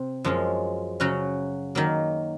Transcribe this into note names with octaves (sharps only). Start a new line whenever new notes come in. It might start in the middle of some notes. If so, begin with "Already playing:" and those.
Already playing: C3 C4
F#2 F3 G#3 C#4
C#3 F#3 C#4 F#4
D#3 F#3 A#3